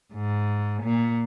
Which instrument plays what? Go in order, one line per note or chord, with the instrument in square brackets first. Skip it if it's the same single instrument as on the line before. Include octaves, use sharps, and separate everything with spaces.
[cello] G#2
A#2